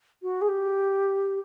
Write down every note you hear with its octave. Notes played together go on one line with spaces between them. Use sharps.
F#4
G#4
G4